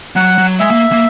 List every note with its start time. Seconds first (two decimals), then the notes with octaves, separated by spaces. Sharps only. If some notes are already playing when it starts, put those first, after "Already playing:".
0.16 F#3 F#5
0.38 F#3
0.60 G#3 E5
0.71 A#3
0.92 A#3